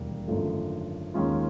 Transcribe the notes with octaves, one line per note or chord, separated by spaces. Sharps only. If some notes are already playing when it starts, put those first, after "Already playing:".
Already playing: E1 D#2 G3 A#3
G#1 F#2 D3 F3 A3
D#2 D#3 G#3 C#4 F4